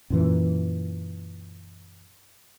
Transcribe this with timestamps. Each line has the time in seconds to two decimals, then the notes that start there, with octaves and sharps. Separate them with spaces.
0.10 F#2 A#2 E3